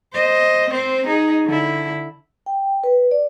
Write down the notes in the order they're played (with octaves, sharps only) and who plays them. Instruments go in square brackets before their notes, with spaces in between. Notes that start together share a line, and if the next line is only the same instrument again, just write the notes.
[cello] C5 D#5
C4 C5
D#4 G#4
D3 E4
[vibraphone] G5
B4
D5